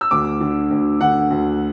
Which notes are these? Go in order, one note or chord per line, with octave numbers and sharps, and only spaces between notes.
E6
D2 D6
D3
D2
D3 F#5
D2